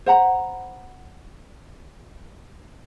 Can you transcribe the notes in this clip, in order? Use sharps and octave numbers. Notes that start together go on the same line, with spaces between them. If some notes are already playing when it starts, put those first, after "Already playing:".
C5 F#5 A#5 B5